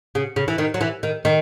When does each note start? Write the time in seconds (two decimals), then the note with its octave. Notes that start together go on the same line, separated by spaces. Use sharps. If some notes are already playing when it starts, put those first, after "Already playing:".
0.15 C#3
0.36 C#3
0.48 E3
0.58 D#3
0.74 F#3
0.81 E3
1.03 D#3
1.25 D#3